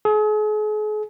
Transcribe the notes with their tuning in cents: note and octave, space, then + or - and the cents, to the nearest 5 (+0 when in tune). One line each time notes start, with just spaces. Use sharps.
G#4 +40